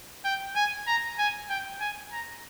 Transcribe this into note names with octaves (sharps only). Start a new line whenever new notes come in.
G5
G#5
A#5
G#5
G5
G#5
A#5